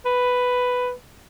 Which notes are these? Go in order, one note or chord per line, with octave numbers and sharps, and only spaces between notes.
B4